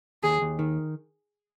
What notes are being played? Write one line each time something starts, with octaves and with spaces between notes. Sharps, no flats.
D#2 G#4
D#2
D#3